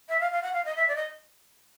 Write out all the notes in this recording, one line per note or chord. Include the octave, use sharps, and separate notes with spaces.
E5
F5
F5
F#5
F5
D#5
E5
D5
D#5